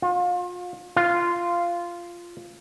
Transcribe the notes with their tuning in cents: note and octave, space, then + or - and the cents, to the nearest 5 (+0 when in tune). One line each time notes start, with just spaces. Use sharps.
F4 +35
F4 -10